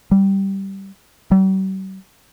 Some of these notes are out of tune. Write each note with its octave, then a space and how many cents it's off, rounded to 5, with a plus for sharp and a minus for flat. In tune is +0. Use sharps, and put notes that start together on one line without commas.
G3 -10
G3 -45